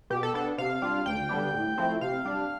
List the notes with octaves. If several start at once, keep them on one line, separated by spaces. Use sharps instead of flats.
B2 G4
A4
B3 D4 A4
C3 F5
G3 D4 F4
D2 G5
D3 G3 B3 D4
A2
F3 A3 C4 E4
C3 F5
G3 D4